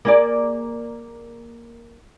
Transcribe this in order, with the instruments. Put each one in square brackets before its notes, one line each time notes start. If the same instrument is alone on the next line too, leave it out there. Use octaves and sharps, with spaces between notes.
[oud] A#3 G#4 D5